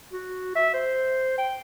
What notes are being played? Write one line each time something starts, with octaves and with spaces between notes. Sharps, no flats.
F#4
E5
C5
G5